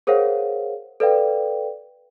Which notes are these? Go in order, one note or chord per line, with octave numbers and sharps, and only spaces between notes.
G#4 A#4 C5 C#5 F5 F#5
A4 B4 D5 F5 G5